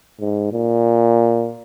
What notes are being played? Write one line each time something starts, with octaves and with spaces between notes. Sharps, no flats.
G#2
A#2